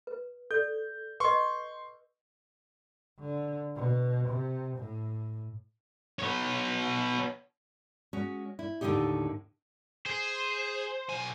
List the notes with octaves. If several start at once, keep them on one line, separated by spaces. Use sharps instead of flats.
B4
A4 D5 G6
B4 D#5 C6 C#6
D3
B2
C3
A2
B3 C#5
G#3 C#4 F#4
E4
D#2 A2 D3 F3 D#4 G4
G#4 C5
B1 G#5